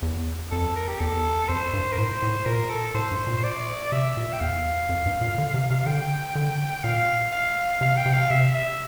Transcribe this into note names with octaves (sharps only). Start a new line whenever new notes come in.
E2
F2 A4
A#4
G4
E2 A4
F2 C5
G2
A#4
A2 C5
A2
A#2 A#4
A4
A2 C5
G2
A#2
C5
D5
C3 E5
A#2
G5
E2 F5
F2
G2
A#2
D3
C3
C3
D3 G5
D3
A#2 F5
F5
C3 F5
G5
C3
F5
C3 E5
E5